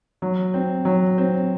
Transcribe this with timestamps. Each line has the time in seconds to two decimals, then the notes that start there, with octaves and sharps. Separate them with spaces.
0.22 F#3
0.54 C4
0.85 F#3
1.18 C4